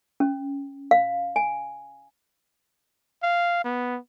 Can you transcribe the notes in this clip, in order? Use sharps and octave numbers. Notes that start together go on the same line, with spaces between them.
C#4
F5
G#5
F5
B3